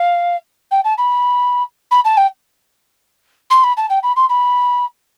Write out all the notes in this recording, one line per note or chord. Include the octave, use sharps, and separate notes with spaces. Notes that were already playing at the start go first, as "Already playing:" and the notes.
Already playing: F5
G5
A5
B5
B5
A5
G5
C6
B5
A5
G5
B5
C6
B5